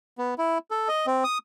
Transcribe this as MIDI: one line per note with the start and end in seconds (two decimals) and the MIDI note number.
0.18 0.34 59
0.38 0.58 64
0.71 0.88 69
0.88 1.06 75
1.07 1.24 60
1.24 1.38 87